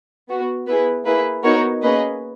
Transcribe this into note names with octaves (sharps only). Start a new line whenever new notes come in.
B3 F#4
B3 E4 G#4 B4
A#3 E4 G#4 B4
B3 D#4 F#4 A#4 C#5
A#3 C#4 G#4 B4 D#5